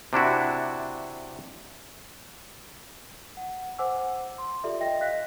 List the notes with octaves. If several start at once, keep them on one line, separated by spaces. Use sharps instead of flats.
C3 D4 E4 F#4
F#5
C5 F#5 G#5 D6 E6
C6
F4 G4 A4 D5 E5
D#5 E5 G5 A#6
D#5 F5 F#6 A#6 B6